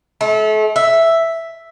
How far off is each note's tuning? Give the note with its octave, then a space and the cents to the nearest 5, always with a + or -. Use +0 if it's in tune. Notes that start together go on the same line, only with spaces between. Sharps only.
A3 -35
E5 +0